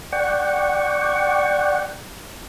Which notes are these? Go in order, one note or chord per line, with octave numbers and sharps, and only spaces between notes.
D5 F#5 G5 C#6